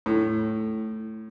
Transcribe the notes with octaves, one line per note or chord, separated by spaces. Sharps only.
A2